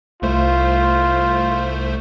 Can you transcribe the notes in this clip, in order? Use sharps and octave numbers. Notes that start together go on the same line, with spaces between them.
C2 A3 F4 C5